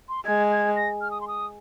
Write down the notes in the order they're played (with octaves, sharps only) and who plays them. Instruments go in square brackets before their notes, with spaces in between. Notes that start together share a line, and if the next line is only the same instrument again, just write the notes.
[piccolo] C6
[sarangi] G#3 [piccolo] G#6
[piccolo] G#6
A#6
F6
D#6
C6
D#6